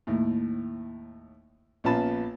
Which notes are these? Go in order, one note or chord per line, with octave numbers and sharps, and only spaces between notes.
D#2 A2
A#1 B3 C#4 F4 A5 B5